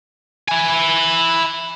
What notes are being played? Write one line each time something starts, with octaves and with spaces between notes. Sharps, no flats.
E4 G#5